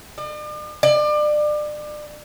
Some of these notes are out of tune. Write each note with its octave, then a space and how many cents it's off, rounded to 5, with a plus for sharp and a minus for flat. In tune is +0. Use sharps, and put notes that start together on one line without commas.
D5 +45
D5 +30